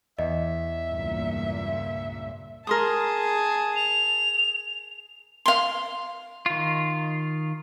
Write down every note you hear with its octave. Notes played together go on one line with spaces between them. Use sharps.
E2 D#5 E5
C#2 G2 A#2
G#4 A#4 A5 C6 D#6
F7
F5 C6
D#3 F4